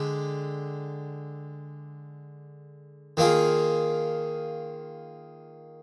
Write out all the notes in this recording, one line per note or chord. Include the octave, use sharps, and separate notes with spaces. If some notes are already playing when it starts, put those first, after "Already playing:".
Already playing: D3 G#3 G4
D#3 A#3 F4 G#4